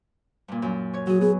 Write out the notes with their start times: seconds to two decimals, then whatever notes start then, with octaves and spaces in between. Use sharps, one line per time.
0.48 G2 A#2
0.62 F#2
0.93 C#5 C#6
1.07 F#3 F#4 G#4
1.21 B3 G#4